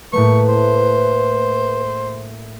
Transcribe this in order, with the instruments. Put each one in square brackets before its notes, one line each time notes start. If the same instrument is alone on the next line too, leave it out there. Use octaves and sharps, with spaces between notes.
[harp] A2 A3 A#3 [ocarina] B4 [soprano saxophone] C#6
[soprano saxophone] C5